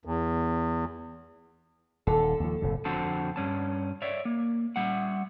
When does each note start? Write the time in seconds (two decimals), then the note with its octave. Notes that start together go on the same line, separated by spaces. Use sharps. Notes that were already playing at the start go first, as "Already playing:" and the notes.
0.05 E2
2.07 D#1 D3 D#3 A4
2.40 D#2 F3
2.62 F#1 A2 C3
2.85 F2 D3 C4 F#4 A5
3.36 G2 C#4 A5
4.02 C#5 D5 E5
4.25 A#3
4.76 G3 E5 F#5